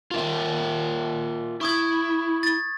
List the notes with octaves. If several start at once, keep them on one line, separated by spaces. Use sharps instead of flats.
F4 A#4 E5
E4 C#6 D#6 G#6
A6